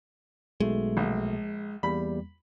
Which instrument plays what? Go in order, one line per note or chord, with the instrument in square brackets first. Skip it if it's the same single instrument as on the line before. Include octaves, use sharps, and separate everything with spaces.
[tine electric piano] B1 B2 A3 [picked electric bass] G#3
[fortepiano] A#1
[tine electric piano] E2 G3 A#3 [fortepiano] B5